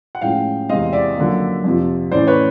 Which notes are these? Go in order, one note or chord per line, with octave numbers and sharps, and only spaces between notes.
F#5
A2 F3 G#3 C#4 F5 G5
E2 C3 E3 G#3 C4 D#5 F5
D5 E5
F#2 D3 F3 A#3
F2 C3 F3
A2 E3 A3 C#4 C5 D5
B4 C#5